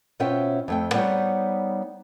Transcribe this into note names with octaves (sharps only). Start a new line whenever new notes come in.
B2 C#4 F4 C5 E5 G5
F2 A3 G5
G3 B3 D#4 G#4 C5 C#5